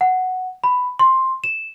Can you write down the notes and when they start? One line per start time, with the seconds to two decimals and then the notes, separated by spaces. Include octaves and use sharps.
0.01 F#5
0.64 B5
0.99 C6
1.44 E7